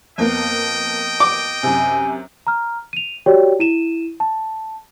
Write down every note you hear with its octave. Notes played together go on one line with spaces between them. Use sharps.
F2 A#3 B3 D#5 G5
D6
F#2 C3 G#5
A#5 F6
D#7 F7
F#4 G4 C#5 D5 G5
E4 D#7 E7
A5